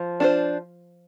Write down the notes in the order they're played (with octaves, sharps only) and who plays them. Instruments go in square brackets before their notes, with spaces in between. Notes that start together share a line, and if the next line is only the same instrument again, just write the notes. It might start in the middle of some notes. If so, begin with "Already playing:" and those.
Already playing: [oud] F3
[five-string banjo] D4 F4 C5